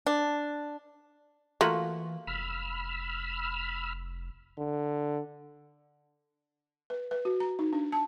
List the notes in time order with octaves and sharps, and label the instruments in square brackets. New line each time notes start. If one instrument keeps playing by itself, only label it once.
[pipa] D4
[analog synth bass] E3 [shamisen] A3 [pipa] A#3 F4 F#4
[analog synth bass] F1 [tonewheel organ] B5 E6 F6
[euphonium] D3
[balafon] B4
B4
F#4
A#5
D#4
D4
A5